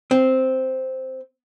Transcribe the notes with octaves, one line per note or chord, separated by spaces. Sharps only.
C4